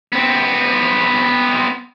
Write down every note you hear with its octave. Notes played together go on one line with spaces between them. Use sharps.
B3 C4